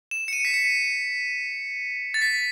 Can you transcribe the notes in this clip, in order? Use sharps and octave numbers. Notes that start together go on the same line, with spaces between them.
E7
C#7
D#7
B6
C#7
A6
B6